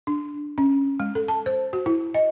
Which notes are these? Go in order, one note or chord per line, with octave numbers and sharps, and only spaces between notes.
D4
C#4
G#3
A4
A5
C5
F#4
E4
D#5